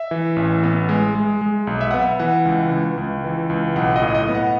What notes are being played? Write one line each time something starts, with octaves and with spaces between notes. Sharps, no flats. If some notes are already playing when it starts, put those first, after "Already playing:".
Already playing: E5
E3
A1
B3
G#3
G#3
G#3
B1
E5
B3 F#5
E5
E3 F#5
C#2
C#2
C#2
E3
C#2
B1 F#5
D#5
A2
D#5
B3
F#5